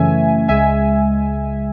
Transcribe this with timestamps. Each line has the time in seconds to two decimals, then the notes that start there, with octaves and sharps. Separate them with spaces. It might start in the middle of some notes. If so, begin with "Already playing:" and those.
Already playing: F#2 C#3 E3 A3 C#4 E5 G#5
0.48 C#2 C#3 G#3 E5 G#5